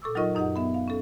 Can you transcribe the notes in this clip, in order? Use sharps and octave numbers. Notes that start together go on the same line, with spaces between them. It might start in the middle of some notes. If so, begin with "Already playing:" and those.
A#2 A4 C#6 D6 E6
F#3 D#4 F4 A#4 D#5 C#6
F#2 D#4 G4 D#5 F#5
B3 E5
B3 F5
C#4 A4